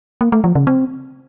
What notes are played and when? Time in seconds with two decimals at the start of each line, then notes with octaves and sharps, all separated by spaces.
0.21 A#3
0.32 A3
0.44 F3
0.55 C#3
0.67 C4